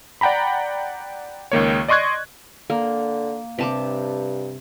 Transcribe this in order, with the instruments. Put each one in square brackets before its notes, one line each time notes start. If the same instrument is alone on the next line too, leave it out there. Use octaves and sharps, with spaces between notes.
[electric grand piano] D5 F#5 G5 A#5 B5
C#2 D#3 A#3 C#5
D5 D#5 C6 C#6 F#6 G#6
[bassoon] D3 [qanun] A#3
[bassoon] G2 [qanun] C3 A5 D6